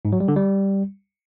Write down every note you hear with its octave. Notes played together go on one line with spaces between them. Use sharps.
G#2
F#3
G3
D3
G3